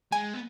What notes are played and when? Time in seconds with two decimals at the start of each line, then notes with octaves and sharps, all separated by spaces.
0.12 G#3 G#5
0.34 B3